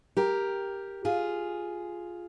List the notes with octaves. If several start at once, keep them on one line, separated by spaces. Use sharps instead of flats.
G4 A#4
F4 G#4